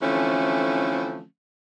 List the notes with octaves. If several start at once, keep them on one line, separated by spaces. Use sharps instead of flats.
D3 E3 F3 A3 C4 C#4